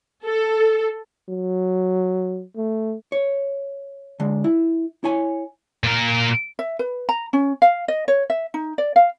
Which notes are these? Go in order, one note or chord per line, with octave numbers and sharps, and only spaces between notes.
A4
F#3
A3
C#5
D3 G#3
E4
E4 C#5 G#5
A#2 A#4
E5
B4
A#5
C#4
F5
D#5
C#5
E5
D#4
D5
F5